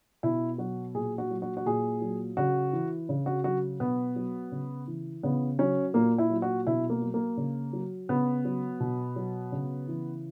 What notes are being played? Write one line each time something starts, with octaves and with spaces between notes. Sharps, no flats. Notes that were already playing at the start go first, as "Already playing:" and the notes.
B2 E4
F#3 F#4
A#2 G#4
F#4
F#3
F#4
F#4
A#2 G#4
F#3
C#3 F#4
E3
C#3
F#4
F#3 F#4
B2 B3
F#3
C#3
E3
C#3 B3
F#3 C#4
A#2 A#3
E4
F#3
F#4
B2 E4
A#3
F#3
A#3
C#3
F#3
C#3 B3
F#3
B2
F#3
C#3
E3